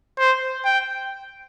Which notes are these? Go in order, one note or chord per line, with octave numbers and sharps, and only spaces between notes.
C5
G5